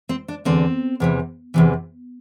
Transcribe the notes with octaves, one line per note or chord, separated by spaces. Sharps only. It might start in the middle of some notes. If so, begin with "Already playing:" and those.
C4
D4
E2 D3 C4
E2 C3 E3
E2 C3 E3